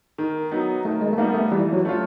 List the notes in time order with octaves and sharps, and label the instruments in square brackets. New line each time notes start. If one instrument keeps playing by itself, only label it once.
[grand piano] D#3
F#3 B3 D#4
[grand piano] D#3 [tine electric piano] A3
[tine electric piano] G#3
A3
[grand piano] G3 B3 D#4 [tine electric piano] A#3
[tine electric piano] A3
[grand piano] E3 [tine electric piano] G3
[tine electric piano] F#3
[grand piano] A3 C#4 F4